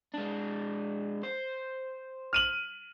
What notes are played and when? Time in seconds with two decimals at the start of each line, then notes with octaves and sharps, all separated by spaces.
0.14 G#3 D4
1.23 C5
2.33 F6 D#7 F#7